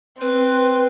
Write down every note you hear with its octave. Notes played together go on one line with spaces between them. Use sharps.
C4 B4